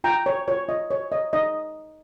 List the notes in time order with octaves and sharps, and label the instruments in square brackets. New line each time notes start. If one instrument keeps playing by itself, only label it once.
[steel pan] F4 G5 A#5
C#5
F4 C#5
F4 D#5
C#5
C#5 D#5
D#4 D#5